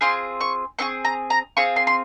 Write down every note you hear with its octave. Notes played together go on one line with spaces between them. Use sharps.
C4 F4 G#4 C6
C#6
C4 F4 G#4 C#6
A#5
A#5
C4 F4 G#4 C#6
C6
C6